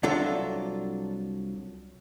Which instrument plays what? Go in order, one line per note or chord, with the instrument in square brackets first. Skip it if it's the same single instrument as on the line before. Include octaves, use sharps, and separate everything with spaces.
[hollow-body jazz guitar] C2 F#3 D4 F4 A4